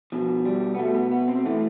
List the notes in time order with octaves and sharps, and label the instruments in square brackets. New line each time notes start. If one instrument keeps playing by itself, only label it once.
[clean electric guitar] B2 F3
G3
B3
B2 A3
B3
B3
C4
A2 E3 A3